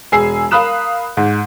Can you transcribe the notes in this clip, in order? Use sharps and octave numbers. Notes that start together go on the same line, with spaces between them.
E1 G#4 G#5 E6 C7
A#4 F5 B5 D#6 F#6 E7
G#2